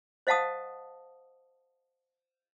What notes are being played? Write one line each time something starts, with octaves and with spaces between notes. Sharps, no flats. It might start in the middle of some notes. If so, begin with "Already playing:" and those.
C5 D#5 F5 F#5 A5 D#6